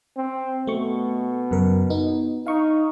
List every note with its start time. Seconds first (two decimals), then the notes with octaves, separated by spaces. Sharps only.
0.17 C4
0.67 B2 A3 C#6
1.51 F#2 C#3 A#4
1.90 B3 D#4
2.47 D#4 F5 C#6